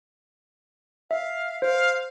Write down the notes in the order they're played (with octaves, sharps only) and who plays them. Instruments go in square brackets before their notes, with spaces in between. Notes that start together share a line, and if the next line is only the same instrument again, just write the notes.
[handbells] E5 [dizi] F5
[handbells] C5 [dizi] F5